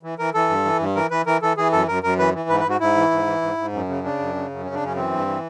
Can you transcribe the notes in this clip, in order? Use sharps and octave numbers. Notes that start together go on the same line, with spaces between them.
E3
E3 A#4
E3 A4
G2
E3
G2
E3 A#4
E3 B4
E3 A#4
E3 A4
E3 G#4
F#2 A4
F#2 A#4
F#2 A#4
E3 B4
E3
G#2 B4
B4
G#2 F#4
G#2 E4
E3
G#2
E3
G#2
G#2
F#2
C#3
C#3 D4
F#2
C#3
F#2
C#3 C#4
D4
F#2 C#4
E3 C4
G2
E3